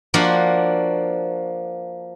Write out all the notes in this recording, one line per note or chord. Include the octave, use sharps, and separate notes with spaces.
F3 A#3 D4 F#4